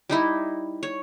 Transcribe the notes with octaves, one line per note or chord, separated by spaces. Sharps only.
G3 D#4 E4
C#5